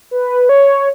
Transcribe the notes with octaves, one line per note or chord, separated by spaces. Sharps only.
B4
C#5